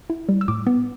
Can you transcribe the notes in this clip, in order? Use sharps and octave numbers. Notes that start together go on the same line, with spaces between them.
E4
G3
E6
A2 D6
B3